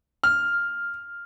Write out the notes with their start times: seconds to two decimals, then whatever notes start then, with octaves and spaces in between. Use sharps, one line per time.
0.24 F6